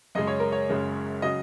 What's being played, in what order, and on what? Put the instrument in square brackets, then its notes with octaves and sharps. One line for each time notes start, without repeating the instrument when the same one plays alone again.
[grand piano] F#2 C#3 G#3 D#5
C#5
A#4
C#5
F#1 F#2 C#3 G#3
C#3 F#3 D#5